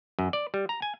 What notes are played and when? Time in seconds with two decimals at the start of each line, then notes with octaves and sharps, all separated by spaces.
0.19 F#2
0.33 D5
0.54 G3
0.69 A#5
0.82 G#5